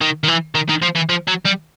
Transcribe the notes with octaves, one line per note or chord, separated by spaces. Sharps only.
D#3
D#3
E3
D#3
D#3
F3
E3
F3
F#3
G3